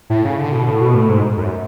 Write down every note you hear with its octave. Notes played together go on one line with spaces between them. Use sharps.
A2
C#3
D3
B2
A2
B2
A2
G#2
F#2